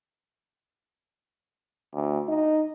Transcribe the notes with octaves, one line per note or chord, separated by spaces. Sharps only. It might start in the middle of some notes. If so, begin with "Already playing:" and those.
D2
D#4